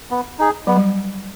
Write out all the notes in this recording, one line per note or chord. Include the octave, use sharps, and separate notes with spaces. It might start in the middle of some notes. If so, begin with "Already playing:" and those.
B3
D#4 G#4
F#3 B3
G3